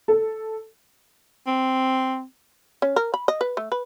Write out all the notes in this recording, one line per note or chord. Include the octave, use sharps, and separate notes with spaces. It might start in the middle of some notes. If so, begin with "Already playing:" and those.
A4
C4
C#4
A#4
B5
D#5
B4
A3
B4